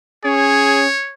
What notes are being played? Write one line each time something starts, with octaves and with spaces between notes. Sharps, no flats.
C#4 G#4 C#5